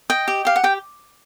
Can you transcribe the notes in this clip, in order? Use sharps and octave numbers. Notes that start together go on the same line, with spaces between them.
D#5 G5
G4
G4 F5
F#5
G4 G5